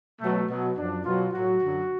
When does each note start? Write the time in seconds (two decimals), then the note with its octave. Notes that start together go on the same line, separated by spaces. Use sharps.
0.21 B2 F#3 A3
0.49 B2 F#3
0.77 F#2 F3 D4
1.05 B2 F#3 F4
1.33 A2 F#3 F#4
1.61 F#2 D3 F#3